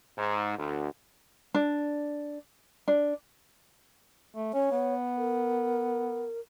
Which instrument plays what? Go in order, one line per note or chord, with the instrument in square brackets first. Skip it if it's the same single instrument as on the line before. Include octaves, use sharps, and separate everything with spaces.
[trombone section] G#2
D2
[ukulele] D4
D4
[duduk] A3
[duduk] C#4 [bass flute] C#5
[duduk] B3
[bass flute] A#4